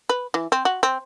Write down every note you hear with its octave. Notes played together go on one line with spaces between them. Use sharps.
B4
E3
C4
F#4
C4